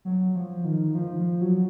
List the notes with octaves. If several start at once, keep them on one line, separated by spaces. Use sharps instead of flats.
F#3
F3
D#3
F3
F3
F#3